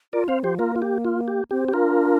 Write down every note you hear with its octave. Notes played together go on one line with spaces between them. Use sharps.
F4 A#4 D5
C4 C5 F5
F3 G4 C5
A#3 F4 A#4
F4
G4
F4
G4
C4 G4
G4
D4 F4 A#4